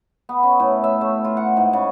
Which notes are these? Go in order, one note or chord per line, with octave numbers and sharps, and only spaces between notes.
B3
C#4
A2
E5
A3
F4
F#5
G#2
C#3